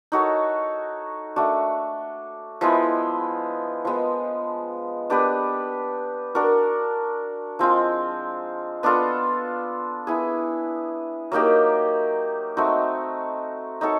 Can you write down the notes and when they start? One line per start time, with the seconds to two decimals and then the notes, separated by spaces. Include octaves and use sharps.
0.12 D#4 F#4 A4 C#5
1.36 A3 D4 F#4
2.61 F3 G#3 B3 E4
3.85 F3 G#3 B3
5.10 B3 D4 G4 B4
6.35 D4 F#4 A#4
7.59 F3 G#3 C4 F4
8.83 B3 D4 F4 A4
10.07 B3 E4 G#4
11.32 F#3 A#3 D#4 G4
12.57 A3 C4 D#4 F#4
13.81 D#4 F#4 A4 C#5